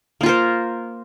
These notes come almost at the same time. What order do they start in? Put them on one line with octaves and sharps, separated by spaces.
A#3 F4 A#4 C5